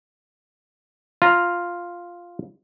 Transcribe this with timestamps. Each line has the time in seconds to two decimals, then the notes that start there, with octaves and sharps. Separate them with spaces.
1.22 F4 A#5